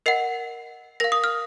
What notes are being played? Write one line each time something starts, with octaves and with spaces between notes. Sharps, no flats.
A#4 D#5 F#5 C7
A#4 F5 A#6
D#6
F6